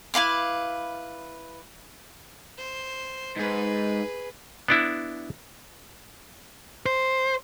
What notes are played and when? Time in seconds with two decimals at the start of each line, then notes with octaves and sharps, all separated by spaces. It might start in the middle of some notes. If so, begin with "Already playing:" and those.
0.14 E4 B4 F5 D6
2.58 C5
3.37 G#2 G#4 B4
4.68 B3 D4 E4
6.86 C5